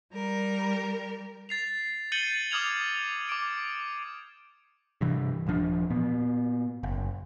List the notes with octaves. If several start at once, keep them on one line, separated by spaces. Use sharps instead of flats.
G3 A#4
A6 C7 F7
G6 A6 C#7 D#7 F#7 G7
D6 D#6 F6 G#6 F7 F#7
D6 D7
G2 C3 E3
D#1 E3 F3 D4
A#2 B3
F#1